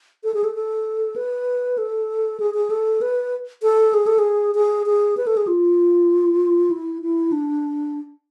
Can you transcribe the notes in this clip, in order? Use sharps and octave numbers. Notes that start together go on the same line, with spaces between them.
A4
G#4
A4
A4
B4
A4
G#4
G#4
A4
B4
A4
G#4
A4
G#4
G#4
G#4
B4
A4
G#4
F4
E4
E4
D4